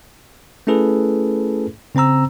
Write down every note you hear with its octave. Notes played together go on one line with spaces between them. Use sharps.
A3 C#4 E4 G#4 A4 B4
C#3 C4 C5 A#5 E6